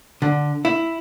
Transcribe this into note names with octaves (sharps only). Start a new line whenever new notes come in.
D3
E4